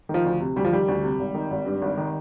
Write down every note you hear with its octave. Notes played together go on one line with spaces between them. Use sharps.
D#3
F3
D2
C3
D2 G3
F3
D#3 G3
D2
C3
G#1
D#3
G#1
G2
G#1
D#3